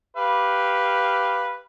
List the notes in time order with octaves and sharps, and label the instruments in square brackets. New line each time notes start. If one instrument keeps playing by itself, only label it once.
[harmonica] G4 B4 F5